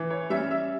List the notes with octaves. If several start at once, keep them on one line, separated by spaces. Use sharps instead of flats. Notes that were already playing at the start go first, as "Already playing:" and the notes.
Already playing: E3
C#5
G3 C#4 E5
E5